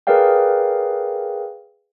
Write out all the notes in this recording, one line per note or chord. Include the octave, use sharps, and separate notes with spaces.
G#4 A#4 B4 D5 F5 G5